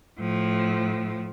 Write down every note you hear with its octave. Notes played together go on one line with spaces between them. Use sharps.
A2 F3